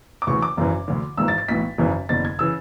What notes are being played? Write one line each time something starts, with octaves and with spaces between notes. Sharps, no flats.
D6
D2 C#3 E3 C#6
D6
G#1 F#2 C#3 E3
D2 D3
G#1 G#2 E3 E6
A6
A6
B1 A2 E3 B6
G#1 F#2 C#3 E3
F#1 E2 D3 A6
G#6
C#3 E3 E6